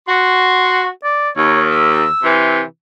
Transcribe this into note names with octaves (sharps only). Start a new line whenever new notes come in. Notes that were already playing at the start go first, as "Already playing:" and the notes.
F#4 C6
D5
D#2 C#5
E6
C3 E3